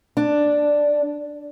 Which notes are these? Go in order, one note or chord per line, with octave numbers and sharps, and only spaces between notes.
D4